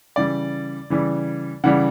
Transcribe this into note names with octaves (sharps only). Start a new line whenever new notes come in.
C#3 E3 G3 D5
C#3 E3 G3
C#3 E3 G3 F#5